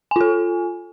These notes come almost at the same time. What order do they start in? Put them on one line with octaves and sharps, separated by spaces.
G#5 F4 A4